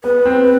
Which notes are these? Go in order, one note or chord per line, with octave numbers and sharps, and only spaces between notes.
B3 B4
C4